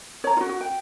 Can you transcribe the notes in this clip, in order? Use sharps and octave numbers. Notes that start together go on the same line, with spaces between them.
C#5 A#5
F4 F#4
F#4
G5